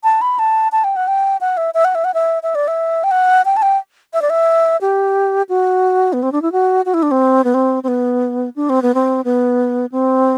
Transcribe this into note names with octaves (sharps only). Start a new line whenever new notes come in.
A5
B5
A5
A5
G5
F#5
G5
F#5
E5
E5
F#5
E5
F#5
E5
E5
D5
E5
G5
F#5
G5
A5
G5
E5
D5
E5
G4
F#4
B3
C4
D4
E4
F#4
F#4
E4
D4
C4
B3
C4
C4
B3
D4
C4
B3
C4
B3
C4